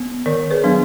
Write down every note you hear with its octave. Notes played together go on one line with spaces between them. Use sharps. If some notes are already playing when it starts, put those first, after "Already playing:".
Already playing: B3
D#3 A#4 D5
G#4 B4
F#3 B3 D4